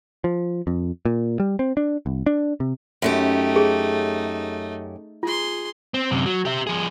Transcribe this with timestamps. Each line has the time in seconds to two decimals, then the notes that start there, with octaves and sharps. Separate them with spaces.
0.24 F3
0.67 F2
1.05 A#2
1.40 G3
1.59 C4
1.77 D4
2.06 C2
2.26 D4
2.60 C3
3.02 F#2 A3 C#4 D#4 G4
3.56 G#4
5.23 F4 G#4 C6
5.94 C4
6.11 F#2 C3
6.26 F#3
6.45 G4 E5
6.67 F3 G#4